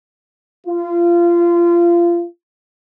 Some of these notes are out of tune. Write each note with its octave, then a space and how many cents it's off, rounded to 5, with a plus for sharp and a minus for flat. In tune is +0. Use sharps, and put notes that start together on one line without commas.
F4 -25